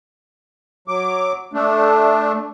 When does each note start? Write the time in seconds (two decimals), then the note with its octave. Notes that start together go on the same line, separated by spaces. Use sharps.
0.88 F#3 D6
1.53 A3 D4